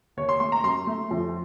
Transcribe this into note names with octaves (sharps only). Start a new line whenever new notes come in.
D#2 C#5
C6
A3 C6
A#5
F#2 C6
A3
F2